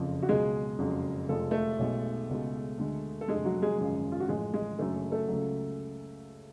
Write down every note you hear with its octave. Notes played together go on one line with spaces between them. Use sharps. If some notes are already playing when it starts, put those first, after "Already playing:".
Already playing: F#1 F2 C#3 F3
F#4
C#2 B2 F#3 G#3 G#4
F#1 F2 C#3 F#3
F1 F2 F3 G#3 A4
A3 A4
B1 B2 G#3
C#2 B2 G#3
D2 D3 G#3
A4
F1 F2 D3 G#3 G#4
F#3 F#4
G#3 G#4
G#1 F#2 C#3 F3 G#3
F4
F#4
A1 A2 F3 G#3 G#4
G#3 G#4
F#1 F#2 D3 F#3 A3 A4
A3 A4
C#2 C#3 F#3